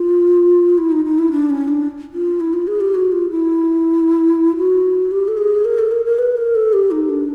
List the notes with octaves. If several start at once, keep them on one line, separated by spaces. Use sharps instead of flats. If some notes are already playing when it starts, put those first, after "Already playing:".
Already playing: F4
E4
D#4
D#4
E4
D4
C#4
D4
F4
E4
F4
G#4
G4
F#4
F4
E4
F#4
G4
A4
G#4
A#4
A4
A#4
A#4
B4
A#4
A4
G4
D#4
D4